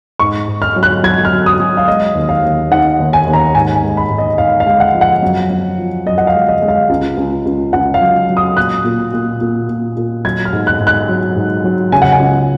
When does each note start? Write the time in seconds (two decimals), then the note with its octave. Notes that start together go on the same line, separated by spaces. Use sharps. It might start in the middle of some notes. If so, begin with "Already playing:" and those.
0.19 G#2 C#6
0.48 G#2
0.62 F6
0.76 F#3
0.83 F#6
1.03 F#3 G#6
1.25 F6
1.32 F#3
1.46 D#6
1.60 F#3
1.77 F5
1.88 G#3 D#5
2.15 D#2
2.29 F5
2.43 D#2
2.71 D#3 F#5
3.00 D#2
3.13 G#5
3.27 D#2
3.33 A#5
3.55 G#2 G#5
3.75 G#5
3.82 G#3
3.97 B5
4.11 G#2
4.18 D#5
4.38 G#2 F5
4.60 F5
4.66 G#3
4.80 F#5
4.95 F3
5.01 F#5
5.22 F#2
5.50 F#2
5.78 F3
6.06 F#2 D#5
6.18 F#5
6.27 F5
6.34 G#3
6.48 D#5
6.62 G#3
6.68 F5
6.89 C#2
7.17 C#2
7.45 C#2
7.73 C#2 F#5
7.94 F5
8.01 F#3
8.29 F#3
8.37 D#6
8.57 A#2 F#6
8.85 A#2
9.14 A#2
9.41 A#2
9.69 A#2
9.97 A#2
10.25 F#3 G#6
10.45 F6
10.53 G#2
10.67 F#6
10.80 G#2
10.87 F#6
11.09 F#3
11.36 G#2
11.64 F#3
11.92 C#3 G#5
12.02 F#5
12.12 G#5
12.19 C#2